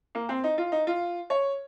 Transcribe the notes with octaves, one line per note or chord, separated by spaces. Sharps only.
A#3
C4
D#4
F4
D#4
F4
C#5